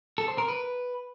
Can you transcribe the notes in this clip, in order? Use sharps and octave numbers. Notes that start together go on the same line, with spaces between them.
A4
C5
A#4
B4